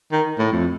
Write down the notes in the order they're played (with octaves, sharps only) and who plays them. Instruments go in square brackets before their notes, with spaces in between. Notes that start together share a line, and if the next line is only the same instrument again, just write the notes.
[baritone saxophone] D#3
A2
F2